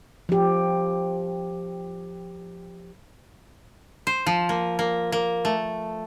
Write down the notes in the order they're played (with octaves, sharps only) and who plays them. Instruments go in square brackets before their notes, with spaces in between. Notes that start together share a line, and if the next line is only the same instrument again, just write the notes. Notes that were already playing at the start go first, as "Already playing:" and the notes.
[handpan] F3 G4
[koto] C5
F3
A#3
A#3
A#3
A3